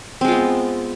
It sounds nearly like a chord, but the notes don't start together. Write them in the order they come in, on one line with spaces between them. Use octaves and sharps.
C4 G#3 F4 B3